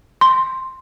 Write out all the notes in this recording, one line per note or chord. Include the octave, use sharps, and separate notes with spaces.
C6